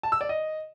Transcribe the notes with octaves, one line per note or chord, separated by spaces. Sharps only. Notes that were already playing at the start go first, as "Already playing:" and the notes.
A5
E6
D5
D#5